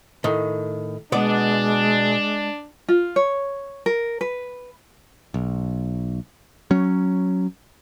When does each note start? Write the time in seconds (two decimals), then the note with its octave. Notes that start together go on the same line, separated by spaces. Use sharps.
0.24 A2 D#3
1.12 B2 G#3 B3 D4 D5
2.88 F4
3.16 C#5
3.86 A#4
4.21 B4
5.34 B1
6.71 F#3 C#4